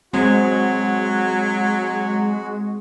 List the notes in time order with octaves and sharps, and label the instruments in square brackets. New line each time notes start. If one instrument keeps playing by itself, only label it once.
[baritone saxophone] F#3 [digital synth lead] G#3 [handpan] C4 [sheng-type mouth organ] F#4